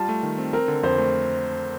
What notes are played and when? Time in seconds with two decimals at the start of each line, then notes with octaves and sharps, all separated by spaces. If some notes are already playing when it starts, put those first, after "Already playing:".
Already playing: G3 F4 A5
0.09 A3
0.23 D#3
0.38 C4
0.53 C4 A#4
0.68 D3
0.83 F2 C5
0.98 A3